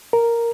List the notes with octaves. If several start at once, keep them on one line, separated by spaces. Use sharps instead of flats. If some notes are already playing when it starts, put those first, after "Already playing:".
A#4